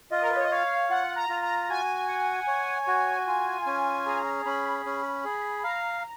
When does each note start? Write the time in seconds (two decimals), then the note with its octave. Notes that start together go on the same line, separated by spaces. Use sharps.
0.11 F4 D#5
0.22 A#4
0.29 B4
0.36 C#5
0.44 D#5
0.51 C#5 F5
0.90 F4 F#5
1.16 A#5
1.29 F4
1.42 A#5
1.69 F#4 G#5
2.08 F#5
2.47 C#5
2.87 F#4
3.27 F4
3.66 C#4
4.05 G#4 A#5
4.45 C#4 B5
4.86 C#4
5.24 G#4
5.63 F5 A#5